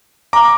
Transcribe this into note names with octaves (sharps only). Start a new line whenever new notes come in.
A#5 D6